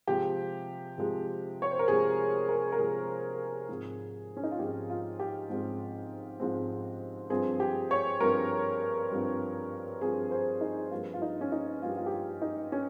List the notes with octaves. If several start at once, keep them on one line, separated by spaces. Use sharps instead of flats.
C3 F3 G#3 G4
C3 F3 G#3
C#5
C5
A#4
C3 F3 G#3 G#4
A#4
A#4
C3 F3 G#3 G#4
G#2 F3 G#3 C4
C#4
D#4
F4
G#2 F3 G#3 C4 G4
F4
G4
G#2 F3 G#3 C4
G#2 F3 G#3 C4
G2 F3 C4 G#4
G4
C#5
G2 F3 C4 A#4
G2 F3 C4
G2 F3 C4 G#4
C5
D#4
G2 F3 A#3 F4
F4
D#4
C#4
D#4
G2 F3 A#3 F4
G4
F4
G4
F4
D#4
C#4